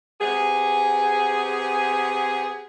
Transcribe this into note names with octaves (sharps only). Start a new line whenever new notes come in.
C3 B3 G#4